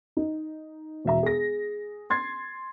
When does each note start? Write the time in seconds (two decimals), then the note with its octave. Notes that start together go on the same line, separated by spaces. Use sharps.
0.17 D#4
1.05 E1 B2 E5 A#5
1.23 G#4 A#6
2.10 C6 G#6 A6 C7